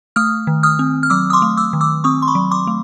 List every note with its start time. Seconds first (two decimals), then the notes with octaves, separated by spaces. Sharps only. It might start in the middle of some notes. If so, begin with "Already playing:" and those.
0.16 A3 D#6 F6
0.47 D#3
0.63 D#6 F6
0.79 C4
1.03 F6
1.10 F#3 D6 E6
1.30 D#6
1.33 C6 D6
1.42 A3
1.57 D6 E6
1.73 D#3
1.81 D6 E6
2.04 C4 C#6 D#6
2.22 C6
2.27 B5 C#6
2.35 F#3
2.51 C6 D6
2.67 A3